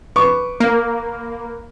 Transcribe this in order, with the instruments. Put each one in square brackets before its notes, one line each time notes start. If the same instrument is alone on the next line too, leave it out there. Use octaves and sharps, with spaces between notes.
[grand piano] B4 C#6 D6
[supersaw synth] A#3